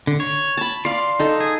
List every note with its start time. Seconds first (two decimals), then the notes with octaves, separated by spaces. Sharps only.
0.07 D3
0.20 C#5
0.57 A5 B5
0.85 D5 F5 C6
1.19 D#4 A4
1.40 G#4